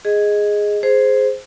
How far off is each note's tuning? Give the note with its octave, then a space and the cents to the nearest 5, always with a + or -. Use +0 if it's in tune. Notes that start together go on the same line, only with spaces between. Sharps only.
G#4 +0 D#5 +0
G#4 +10 C5 +0